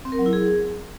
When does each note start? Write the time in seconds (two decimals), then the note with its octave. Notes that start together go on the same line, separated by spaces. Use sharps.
0.05 C4
0.12 A#4
0.19 F#3
0.26 E4
0.33 G#4